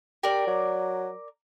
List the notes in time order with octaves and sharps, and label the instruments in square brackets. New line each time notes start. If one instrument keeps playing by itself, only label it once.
[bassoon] G4 [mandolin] A#4 D5
[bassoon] F#3